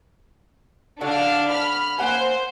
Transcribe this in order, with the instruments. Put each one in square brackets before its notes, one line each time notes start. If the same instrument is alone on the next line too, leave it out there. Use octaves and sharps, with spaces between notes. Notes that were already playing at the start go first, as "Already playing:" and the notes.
[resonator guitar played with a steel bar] D3 F#4 [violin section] D4 F5
[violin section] B5 F6
[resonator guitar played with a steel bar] A#3 F#5 G#5 [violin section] C5